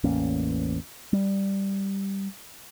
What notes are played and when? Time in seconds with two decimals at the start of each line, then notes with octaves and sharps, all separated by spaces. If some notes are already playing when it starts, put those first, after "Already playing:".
0.04 A1 E2 A#3 C#4
1.13 G3